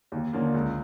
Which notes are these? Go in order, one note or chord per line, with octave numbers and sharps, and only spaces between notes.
D#2
D3 F3 A#3 C#4
C#2